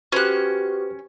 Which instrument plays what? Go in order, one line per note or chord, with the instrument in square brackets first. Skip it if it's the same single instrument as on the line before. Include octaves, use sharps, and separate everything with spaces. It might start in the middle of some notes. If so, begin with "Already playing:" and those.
[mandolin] C#4 F#6 [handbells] F#4 G4 [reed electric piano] B4 C5 F6